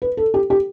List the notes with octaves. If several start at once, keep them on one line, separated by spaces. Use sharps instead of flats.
B4
A4
G4
G4